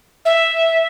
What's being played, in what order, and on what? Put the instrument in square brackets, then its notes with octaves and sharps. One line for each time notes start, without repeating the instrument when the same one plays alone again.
[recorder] E5